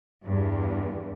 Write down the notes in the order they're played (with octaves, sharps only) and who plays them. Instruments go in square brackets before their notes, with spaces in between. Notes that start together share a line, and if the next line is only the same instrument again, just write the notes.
[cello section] E2 G2